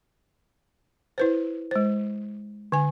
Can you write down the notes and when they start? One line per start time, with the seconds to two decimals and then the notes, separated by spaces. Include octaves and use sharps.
1.18 E4 B4 C5
1.71 G#3 C5
2.72 D3 G#5